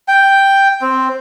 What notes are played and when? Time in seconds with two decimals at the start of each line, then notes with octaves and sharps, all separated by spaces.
0.08 G5
0.82 C4